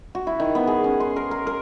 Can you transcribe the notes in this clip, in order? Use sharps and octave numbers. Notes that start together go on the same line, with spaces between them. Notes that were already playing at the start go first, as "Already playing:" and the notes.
F#4
E4
D#3
B3
G#4
C#4
C6
A#4
A#4
A#4